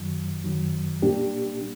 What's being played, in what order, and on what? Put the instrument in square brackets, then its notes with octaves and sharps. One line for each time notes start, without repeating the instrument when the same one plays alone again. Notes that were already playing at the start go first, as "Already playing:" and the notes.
Already playing: [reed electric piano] F#2 D#3 F#3
F#2 D#3 F#3
A#2 G3 A#3 D4 G4